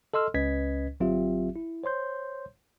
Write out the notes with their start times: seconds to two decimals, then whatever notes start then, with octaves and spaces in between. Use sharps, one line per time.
0.14 A4 D#5 C6 E6 F6
0.34 C#2 C#4 B4 D#5 G#6 B6
1.00 G1 F#3 C4 F4 G4 E5
1.56 E4
1.84 C5 C#5 C6 G6